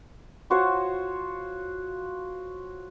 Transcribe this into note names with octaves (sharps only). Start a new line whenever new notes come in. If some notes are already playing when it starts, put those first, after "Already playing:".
F4 F#4 C5 C#5